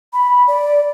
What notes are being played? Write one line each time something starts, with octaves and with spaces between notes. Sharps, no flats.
B5
D5